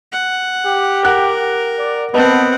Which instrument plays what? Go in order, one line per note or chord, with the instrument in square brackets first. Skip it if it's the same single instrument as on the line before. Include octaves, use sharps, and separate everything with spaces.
[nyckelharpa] F#5
[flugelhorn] G4
[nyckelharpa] A#4 [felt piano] F#5 F#6
[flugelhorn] D5
[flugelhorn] B3 [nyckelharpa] C4 F#5 [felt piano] B4 D#5 A5